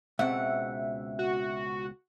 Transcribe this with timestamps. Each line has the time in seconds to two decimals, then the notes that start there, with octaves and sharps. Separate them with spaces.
0.19 C#2 B2 C4 E5 F#5
1.19 F#4